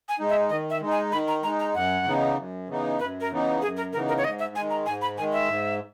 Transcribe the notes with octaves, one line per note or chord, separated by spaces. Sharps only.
G#5
G#3 D#4
E5
D#3 D#5
E5
G#3 D#4
G#5
D#3 B5
A#5
G#3 D#4 A#5
A#5
F#2 F#5
C#3 E3 B3 D#4
F#2
C#3 E3 B3 D#4
F#2 B4
A#4
C#3 E3 B3 D#4
F#2 G#4
A#4
C#3 E3 B3 D#4 A#4
A#4
C#5
G#2 D#5
E5
D#3 G#3 G#5
A#5
G#2 G#5
B5
D#3 G#3 G#5
E5
G#2